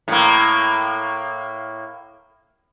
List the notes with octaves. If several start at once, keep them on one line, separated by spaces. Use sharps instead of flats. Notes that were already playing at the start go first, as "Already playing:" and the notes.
A2 A#3